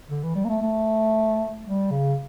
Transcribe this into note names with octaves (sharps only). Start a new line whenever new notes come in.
D3
E3
G3
A#3
A3
A3
G3
C#3